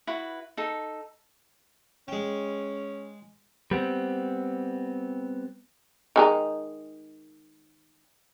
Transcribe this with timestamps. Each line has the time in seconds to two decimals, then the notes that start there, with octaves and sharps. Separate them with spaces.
0.07 E4 F#4 B4
0.57 D#4 A4
2.08 G#3 C#4 G5
3.71 G3 B3 C4
6.16 D#3 G#3 D#4